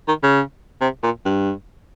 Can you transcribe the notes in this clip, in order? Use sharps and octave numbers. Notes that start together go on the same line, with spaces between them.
D#3
C#3
C3
A#2
G2